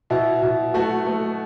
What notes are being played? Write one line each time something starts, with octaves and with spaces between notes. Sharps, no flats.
B2 E4
B2
A3 F#4
A3